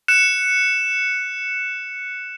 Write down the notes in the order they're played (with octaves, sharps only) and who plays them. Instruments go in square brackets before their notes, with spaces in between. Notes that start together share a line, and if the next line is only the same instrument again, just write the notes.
[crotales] F#6 C#7 E7